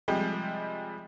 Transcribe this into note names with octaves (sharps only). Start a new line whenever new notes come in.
C3 F3 G3 G#3